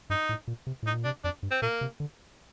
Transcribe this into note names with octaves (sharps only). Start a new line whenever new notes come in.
G2 D#4
A2
A#2
C3
A2 D#4
A#2
C3 D4
F2 D4
G2
C4
A#2 A#3
C3
D3